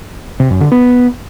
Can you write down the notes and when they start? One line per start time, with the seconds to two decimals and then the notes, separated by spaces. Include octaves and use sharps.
0.40 C3
0.50 F#2
0.61 D3
0.72 B3